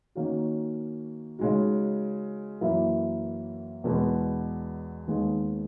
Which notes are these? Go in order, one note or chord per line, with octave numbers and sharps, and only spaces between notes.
D#3 A#3 C#4 F#4
C#3 G#3 D#4 F#4
F#2 E3 A#3 E4
E2 B2 G#3 B3
D#2 D#3 G#3 B3